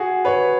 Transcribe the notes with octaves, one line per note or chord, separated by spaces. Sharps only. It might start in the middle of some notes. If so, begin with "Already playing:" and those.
Already playing: F#4 G#4
B4 C#5